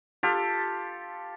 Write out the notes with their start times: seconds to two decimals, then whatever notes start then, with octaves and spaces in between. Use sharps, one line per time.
0.23 F4 G4 A4